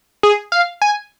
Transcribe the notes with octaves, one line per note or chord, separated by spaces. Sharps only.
G#4
F5
G#5